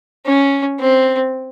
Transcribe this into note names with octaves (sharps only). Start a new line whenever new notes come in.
C#4
C4